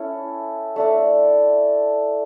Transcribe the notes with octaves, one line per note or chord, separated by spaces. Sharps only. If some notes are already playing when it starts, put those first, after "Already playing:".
Already playing: C#4 E4 A4
A3 D4 A4